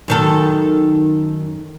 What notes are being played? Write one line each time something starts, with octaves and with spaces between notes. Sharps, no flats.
F#2 D#3 A4